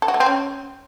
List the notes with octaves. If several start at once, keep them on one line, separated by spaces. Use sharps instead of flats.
A4
F#4
A3
C4
C#4